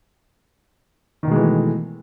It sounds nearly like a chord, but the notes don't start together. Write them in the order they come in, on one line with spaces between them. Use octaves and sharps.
D#3 B2 G#3 E3 A3